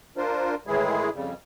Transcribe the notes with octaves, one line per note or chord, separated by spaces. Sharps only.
D4 F4 A#4 C5
A2 D#3 E3 G#3 E4 G#4
F2 C#3 G3